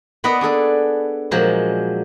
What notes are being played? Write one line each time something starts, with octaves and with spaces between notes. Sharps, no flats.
B3 B4 D5 D#5 F#5
D4 G#4 A4 D5
A#2 F3 F#3 G#3